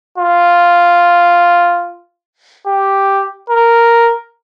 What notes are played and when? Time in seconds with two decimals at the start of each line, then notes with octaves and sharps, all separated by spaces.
0.18 F4
2.67 G4
3.50 A#4